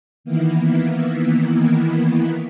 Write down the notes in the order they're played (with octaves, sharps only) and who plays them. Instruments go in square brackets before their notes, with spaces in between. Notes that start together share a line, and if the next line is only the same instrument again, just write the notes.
[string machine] D#3 E3 A#3 B3 E4